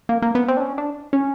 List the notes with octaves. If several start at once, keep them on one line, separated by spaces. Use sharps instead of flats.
A#3
A#3
B3
C4
D4
C#4
D4
C#4